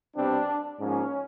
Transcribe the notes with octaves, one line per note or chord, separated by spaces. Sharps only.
C2 B2 G3 C4 D4
G#2 F3 A#3 C#4